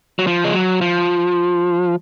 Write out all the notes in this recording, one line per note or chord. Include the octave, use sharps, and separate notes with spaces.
F#3
F3
G#3
F#3
F3